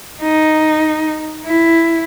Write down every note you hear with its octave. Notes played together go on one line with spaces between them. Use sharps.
D#4
E4